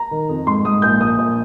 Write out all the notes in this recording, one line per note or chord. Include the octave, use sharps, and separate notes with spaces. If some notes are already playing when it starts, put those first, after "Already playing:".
Already playing: A#5
D#3
F2
G#2 C6
G#2 D#6
A#1 G6
A#1 D#6
A#1